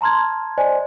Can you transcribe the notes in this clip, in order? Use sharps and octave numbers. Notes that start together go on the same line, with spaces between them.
A5 A#5 C6 F6 G#6
C5 D5 D#5 G#5